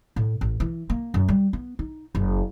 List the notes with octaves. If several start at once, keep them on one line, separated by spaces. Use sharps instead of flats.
A2
A1
E3
A#3
F#2
G3
B3
D#4
F#1